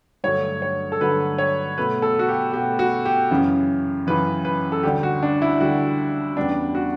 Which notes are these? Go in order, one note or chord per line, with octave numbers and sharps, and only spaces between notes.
G2 D3 F#3 A3 C#5
C#5
A4
G2 D3 F#3 A3 B4
C#5
B2 A3 B4
A4
F#4
G4
B2 A3 G4
F#4
G4
F#2 C#3 E3
F#2 C#3 E3 B4
B4
A4
D2 D3 G3 G4
F#4
D4
E4
D2 D3 G3 F#4
E2 C#3 G3 B3 D4
F#4